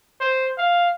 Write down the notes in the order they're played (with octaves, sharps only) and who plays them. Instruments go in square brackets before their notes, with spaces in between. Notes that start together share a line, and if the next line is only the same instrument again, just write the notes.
[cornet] C5
F5